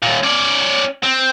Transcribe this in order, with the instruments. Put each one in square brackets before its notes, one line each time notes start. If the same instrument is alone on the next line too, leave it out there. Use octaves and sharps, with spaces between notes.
[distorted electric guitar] D#2 A#2
C#4 D5
C4